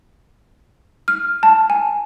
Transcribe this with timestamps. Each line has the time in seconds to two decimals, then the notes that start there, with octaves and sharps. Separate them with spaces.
1.08 F6
1.43 A5
1.70 G#5